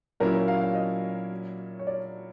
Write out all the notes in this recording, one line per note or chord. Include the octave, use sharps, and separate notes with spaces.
A#2 F#3 A#3 C#4 E4 A#4
F5
F5
D#5
C#5
D5